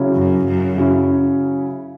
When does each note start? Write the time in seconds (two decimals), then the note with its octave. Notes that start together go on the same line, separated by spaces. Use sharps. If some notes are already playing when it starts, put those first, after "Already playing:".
Already playing: C#3 F#3 C#4 E4
0.16 F#2
0.47 F#2
0.76 C#3 F#3 C#4 E4